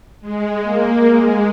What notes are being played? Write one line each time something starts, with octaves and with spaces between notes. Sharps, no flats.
G#3
A#3
G#3